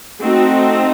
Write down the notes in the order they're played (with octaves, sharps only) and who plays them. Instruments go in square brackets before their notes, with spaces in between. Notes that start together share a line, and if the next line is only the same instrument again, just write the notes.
[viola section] A3 C4 D#4 F#4